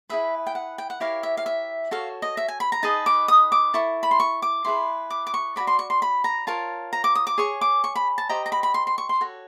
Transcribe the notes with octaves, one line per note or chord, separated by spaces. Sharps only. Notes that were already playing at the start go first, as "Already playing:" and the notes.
E4 G#4 B4 E5
G5
F#5
G5
F#5
E4 G4 A#4 C#5 F5
E5
F5
E5
F#4 A4 C#5 F5
D#5
E5
G#5
B5
A#5
D#4 G#4 B4 D#5 A5
D6
D#6
D6
E4 A4 C#6
B5
C6
C#6
D6
E4 G#4 B4 C6
D6
D6
C#6
F#4 A4 D5 B5
C6
C#6
C6
B5
A#5
F4 A#4 C#5 A5
A#5
D6
D#6
D6
G#4 C#5 C#6
D6
C#6
B5
A5
G4 C5 D#5 A#5
A#5
B5
B5
C6
C6
C#6
C6
F#4 A4 C#5